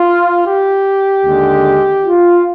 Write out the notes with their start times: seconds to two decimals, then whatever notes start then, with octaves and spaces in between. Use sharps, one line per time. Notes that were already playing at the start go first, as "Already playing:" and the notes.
Already playing: F4
0.45 G4
1.25 D#2 D3 G#3
2.06 F4